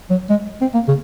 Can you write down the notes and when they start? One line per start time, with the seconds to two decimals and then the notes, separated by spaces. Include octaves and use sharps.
0.10 F#3
0.30 G#3
0.61 C4
0.74 A#3
0.88 C#3